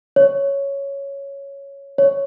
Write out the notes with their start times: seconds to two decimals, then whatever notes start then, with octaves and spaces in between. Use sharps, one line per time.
0.16 C#5
1.98 C#5